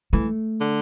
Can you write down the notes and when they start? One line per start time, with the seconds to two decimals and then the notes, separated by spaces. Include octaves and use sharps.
0.13 E3 A3
0.61 D3